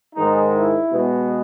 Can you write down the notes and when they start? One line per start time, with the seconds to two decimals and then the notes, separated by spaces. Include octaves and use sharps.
0.15 G#2 D#3 G#3 D#4
0.53 E4
0.90 B2 G#3 B3